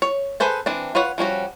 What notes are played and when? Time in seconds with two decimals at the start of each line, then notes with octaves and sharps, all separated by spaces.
0.02 C#5
0.40 G#4 A4 B4 C5 G#5
0.66 E3 C4 D4
0.95 F4 B4 C#5 F#5
1.18 F3 G3 C#4 F#4